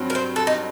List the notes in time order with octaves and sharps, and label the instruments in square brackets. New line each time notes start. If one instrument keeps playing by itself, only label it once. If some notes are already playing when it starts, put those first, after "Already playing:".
Already playing: [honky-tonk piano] G2 F#3 C4
[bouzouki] A#4
C5
A4
D#4